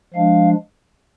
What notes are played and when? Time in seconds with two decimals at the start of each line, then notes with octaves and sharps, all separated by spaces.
0.14 F3 G#3 D4 F5